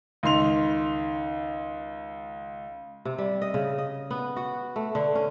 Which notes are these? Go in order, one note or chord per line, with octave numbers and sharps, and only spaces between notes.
C#2 D#3 C6 F7
C3
G3
D#5
C#3
D#5
B3
F#4
A3
D3
C#4